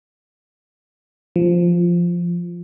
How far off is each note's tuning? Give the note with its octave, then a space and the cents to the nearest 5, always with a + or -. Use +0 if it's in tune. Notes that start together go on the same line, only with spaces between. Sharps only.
F3 -5